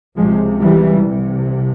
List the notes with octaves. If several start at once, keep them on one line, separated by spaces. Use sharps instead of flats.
C#2 C3 F3 G#3
E3 G3
C2 C3